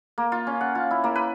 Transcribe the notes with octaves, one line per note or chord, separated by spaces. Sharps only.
A#3
F4
C#4
F#5
F4
E4
A#3
B4